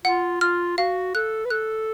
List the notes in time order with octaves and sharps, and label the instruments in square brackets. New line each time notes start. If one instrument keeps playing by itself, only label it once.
[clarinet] F4 [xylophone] F#5
[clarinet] F4 [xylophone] F6
[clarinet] F#4 [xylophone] F5
[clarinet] A4 [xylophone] F#6
[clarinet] B4
[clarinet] A4 [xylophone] F#6